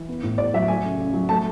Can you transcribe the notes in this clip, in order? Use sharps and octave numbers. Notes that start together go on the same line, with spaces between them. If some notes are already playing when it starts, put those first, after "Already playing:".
Already playing: E3
B3
A2
A2 D5
F#3 E5
A3 G#5
C#3
C#3
F#3
A3 A5